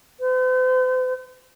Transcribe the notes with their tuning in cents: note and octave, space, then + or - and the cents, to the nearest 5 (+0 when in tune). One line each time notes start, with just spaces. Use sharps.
C5 -45